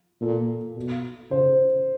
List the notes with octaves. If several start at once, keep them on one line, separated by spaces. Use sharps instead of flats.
A#2 A4
B2
C#3 C5